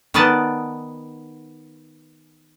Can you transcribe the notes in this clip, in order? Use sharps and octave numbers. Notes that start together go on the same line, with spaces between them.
D#3 B3 B4 D5 D#5 A5